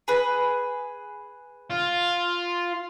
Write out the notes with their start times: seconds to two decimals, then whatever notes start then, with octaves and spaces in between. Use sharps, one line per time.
0.08 G#4 B4
1.70 F4